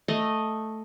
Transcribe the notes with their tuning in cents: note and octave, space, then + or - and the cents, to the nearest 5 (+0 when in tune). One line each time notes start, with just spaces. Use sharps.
A3 +0 D#5 +0